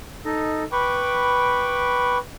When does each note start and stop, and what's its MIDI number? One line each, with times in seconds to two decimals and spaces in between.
0.25 0.63 63
0.25 0.63 69
0.25 0.63 75
0.72 2.18 71
0.72 2.18 79
0.72 2.18 83
0.72 2.18 85
0.72 2.18 86